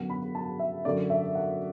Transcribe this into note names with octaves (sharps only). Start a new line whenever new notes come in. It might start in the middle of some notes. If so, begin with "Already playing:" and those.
Already playing: F#2 D3 B3 F#5
B5
A5
E5
F#2 D3 A3 D5
E5
F#5